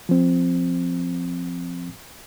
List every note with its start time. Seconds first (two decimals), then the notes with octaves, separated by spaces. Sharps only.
0.09 F3 C4